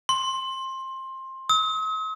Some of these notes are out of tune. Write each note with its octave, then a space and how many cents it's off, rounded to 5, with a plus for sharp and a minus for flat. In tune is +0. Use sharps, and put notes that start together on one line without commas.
C6 +20
D#6 +45